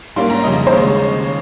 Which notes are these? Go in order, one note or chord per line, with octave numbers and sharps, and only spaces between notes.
G#2 G3 A#3 C#4 C6
A#5
F2 C#3 G3 D#5
C5
D#2 C#3 G#3 C#5